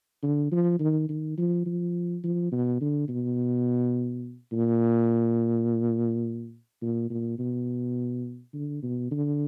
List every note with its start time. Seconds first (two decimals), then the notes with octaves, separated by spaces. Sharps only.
0.23 D3
0.52 F3
0.80 D#3
1.09 D#3
1.38 F3
1.66 F3
2.23 F3
2.52 B2
2.81 D3
3.09 B2
4.52 A#2
6.81 A#2
7.10 A#2
7.39 B2
8.54 D3
8.83 B2
9.11 D3